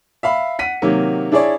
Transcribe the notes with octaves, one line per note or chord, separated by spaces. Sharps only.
E5 F5 B5
F#5 B6 D#7
C3 D#3 F#3 A#3
D4 E4 G#4 C#5 D5